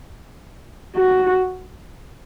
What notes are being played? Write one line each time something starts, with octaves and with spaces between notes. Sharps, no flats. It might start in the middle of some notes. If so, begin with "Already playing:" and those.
F#4